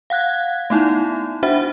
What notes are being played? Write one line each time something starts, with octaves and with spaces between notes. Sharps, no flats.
F5 F#5 F#6 G#6
A3 B3 D#4 E4
D4 F#4 C5 E5 F#5